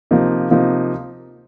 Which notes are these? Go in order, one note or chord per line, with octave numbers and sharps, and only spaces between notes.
C3 F3 A#3 D#4
C3 F3 A#3 D#4